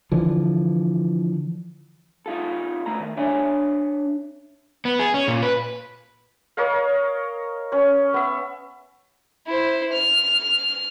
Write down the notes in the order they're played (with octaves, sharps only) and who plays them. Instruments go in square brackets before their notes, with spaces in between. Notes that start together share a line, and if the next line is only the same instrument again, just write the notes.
[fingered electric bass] D3 E3 F3
[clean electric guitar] D#4 F4 A4
D2 A3 A#5
D#3
D4 C#5 E5 G#5
[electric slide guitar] B3
G#4
C#4
A#2
B4
[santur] A#4 C#5 D#5 F5
C#4 C#5
B3 E5
[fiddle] E4 C5
F6